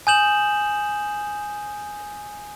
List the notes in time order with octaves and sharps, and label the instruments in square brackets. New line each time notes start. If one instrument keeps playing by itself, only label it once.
[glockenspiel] G#5 D#6 G6 E7 F#7